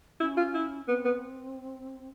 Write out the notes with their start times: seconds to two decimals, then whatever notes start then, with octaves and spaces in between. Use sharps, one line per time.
0.20 C#4 E4
0.37 F4
0.54 E4
0.88 B3 C4
1.05 B3